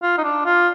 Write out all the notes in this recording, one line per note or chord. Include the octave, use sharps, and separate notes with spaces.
F4
D#4
D4
F4